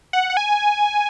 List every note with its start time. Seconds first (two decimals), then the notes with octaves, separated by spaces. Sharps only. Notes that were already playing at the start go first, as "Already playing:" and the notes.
0.13 F#5
0.30 F#5
0.37 G#5